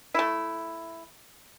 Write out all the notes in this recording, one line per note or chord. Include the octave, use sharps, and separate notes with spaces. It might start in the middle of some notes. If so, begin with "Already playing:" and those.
A3 E4